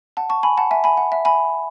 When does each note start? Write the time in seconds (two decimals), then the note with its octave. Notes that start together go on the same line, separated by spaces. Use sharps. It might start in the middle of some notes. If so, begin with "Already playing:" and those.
0.17 F#5 A5
0.30 A5 C#6
0.43 G#5 B5
0.57 F#5 A5
0.71 E5 G#5
0.84 G#5 B5
0.97 F#5
1.12 E5
1.25 G#5 B5